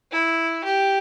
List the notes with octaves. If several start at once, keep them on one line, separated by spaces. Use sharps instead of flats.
E4
G4